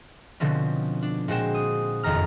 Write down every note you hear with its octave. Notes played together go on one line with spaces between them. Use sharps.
B2 D3 F3 C4 C#4
D4
A#2 G#3 F#4 C5 G5 E7
D#6
F#1 F2 D#3 A#5 F6